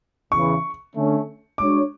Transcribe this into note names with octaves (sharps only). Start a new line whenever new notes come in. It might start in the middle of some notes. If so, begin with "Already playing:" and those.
E2 C#3 E3 C#6
D3 A3 C#4
G#3 D4 F#4 C#5 D6